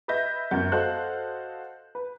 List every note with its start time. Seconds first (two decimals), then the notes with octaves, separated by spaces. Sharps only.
0.08 B4 D#5 E5 G6 A#6
0.51 G1 F#2 F#5 G6
0.72 F#4 A4 C5 D#5 F5 F#6
1.95 B4